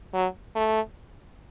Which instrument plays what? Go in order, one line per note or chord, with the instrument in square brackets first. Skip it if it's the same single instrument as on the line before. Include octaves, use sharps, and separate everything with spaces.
[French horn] F#3
A3